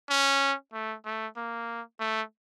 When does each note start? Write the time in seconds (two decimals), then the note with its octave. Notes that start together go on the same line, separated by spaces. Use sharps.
0.10 C#4
0.73 A3
1.05 A3
1.37 A#3
2.00 A3